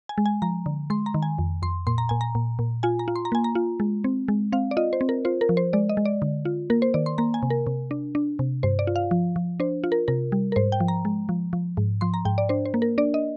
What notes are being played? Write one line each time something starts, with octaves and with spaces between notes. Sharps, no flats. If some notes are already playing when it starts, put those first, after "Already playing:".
G#5
G#3
G#5
F3 A#5
D3
G#3 C6
A#5
D#3
G#5
F2
F2 C6
A#2 C6
A#5
A#2 G#5
A#5
A#2
A#2
F4 G#5
A#5
F4
C6
A#5
A#3 G#5
A#5
F4
G#3
C4
G#3
C4 F5
D5
F4 D#5
C5
C4
A#4
F4 C5
A#4
F3
C5
G#3 D5
D#5
G#3
D5
D3
F4
A#3 A#4
C5
D#3 D5
C6
A#3 A#5
G#5
C3
A#4
C3
D4
D4
C3
G2 C5
D5
F4
F5
F3
F3
D4 C5
F4
A#4
C3 A#4
G3
A#4
G#2 C5
G5
F3
A#5
G#3
F3
F3
G#2
F3 C6
A#5
G#2 G5
D5
D4 C5
C5
A#3
A#4
D4 D5
D#5